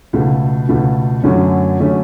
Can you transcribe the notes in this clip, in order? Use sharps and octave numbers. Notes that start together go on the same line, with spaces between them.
C#2 B2 A3
C#2 B2 A3
F#2 D3 F#3 A3 C#4
D3 F#3 A3 C#4